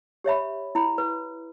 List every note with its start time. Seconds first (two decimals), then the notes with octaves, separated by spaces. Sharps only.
0.24 G4 C#5 E5 B5
0.75 E4 B5
0.98 B4